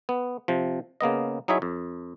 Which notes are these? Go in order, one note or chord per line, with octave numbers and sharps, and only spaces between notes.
B3
C3 F3
C#3 A#3 B3 D#5
F#3 D#4 E4 G#4 C#5 E5
F2